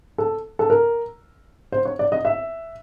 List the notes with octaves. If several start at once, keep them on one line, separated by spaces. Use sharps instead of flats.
A4
A4
A#4
C5
C#5
D5
D#5
E5